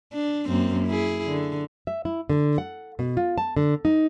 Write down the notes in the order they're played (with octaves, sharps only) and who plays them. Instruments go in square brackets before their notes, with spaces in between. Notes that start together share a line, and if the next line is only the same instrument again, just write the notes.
[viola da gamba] D4
F#2 A#3 C4
E4 G#4
D3
[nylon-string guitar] E5
E4
D3
F#5
B2
F4
A5
D3
D#4